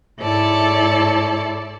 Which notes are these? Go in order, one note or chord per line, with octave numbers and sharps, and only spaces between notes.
G#2 E4 A4 C#5 D5 A5